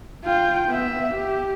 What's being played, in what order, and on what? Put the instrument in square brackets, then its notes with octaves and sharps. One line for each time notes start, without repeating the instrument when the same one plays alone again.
[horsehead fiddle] F4 G5
B3 E5
G4